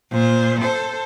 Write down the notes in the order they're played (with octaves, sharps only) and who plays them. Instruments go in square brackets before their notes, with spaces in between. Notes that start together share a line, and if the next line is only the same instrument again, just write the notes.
[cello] A#2 C5
A4 C5